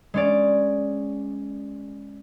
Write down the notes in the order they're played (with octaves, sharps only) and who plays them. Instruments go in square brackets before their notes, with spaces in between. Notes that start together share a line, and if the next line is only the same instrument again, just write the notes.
[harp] G#3 C#4 D5